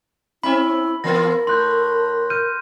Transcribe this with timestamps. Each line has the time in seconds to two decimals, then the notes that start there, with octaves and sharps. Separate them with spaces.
0.43 C4 C#4 E4 E5 B5
1.04 E3 B3 F4 A#4 A#6
1.47 A2 C6 F#6 G6
2.30 F6 G6 D#7